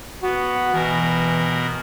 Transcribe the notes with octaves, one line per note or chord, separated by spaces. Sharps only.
B3 F#4
B2 E3 A#4